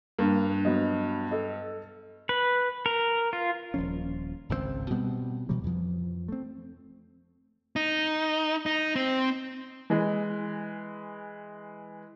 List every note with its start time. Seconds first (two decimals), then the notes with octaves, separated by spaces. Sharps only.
0.19 G2 A#3
0.65 F#3 B3 D#5
1.31 A4 D#5
2.29 B4
2.86 A#4
3.33 F4
3.74 D#1 F3 C#4
4.49 G#1 C#2 C3 C4
4.90 B2 G3 B3 C4
5.49 B2 E3 F#3 G3
5.64 F2 E3 F3
6.28 A3 C4
7.76 D#4
8.66 D#4
8.96 C4
9.90 E3 G#3